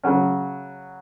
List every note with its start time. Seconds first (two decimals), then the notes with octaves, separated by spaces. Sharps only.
0.03 C#3 F#3 C#4